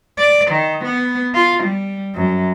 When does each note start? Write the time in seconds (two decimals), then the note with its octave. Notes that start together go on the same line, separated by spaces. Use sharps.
0.18 D5
0.51 D#3
0.84 B3
1.35 F4
1.64 G3
2.15 F#2